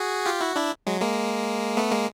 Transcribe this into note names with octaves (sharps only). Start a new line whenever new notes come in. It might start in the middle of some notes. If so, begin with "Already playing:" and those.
Already playing: F#4 G#4
F4 G4
E4 F#4
D4 E4
F#3 G#3
G#3 A#3
A3 B3
G#3 A#3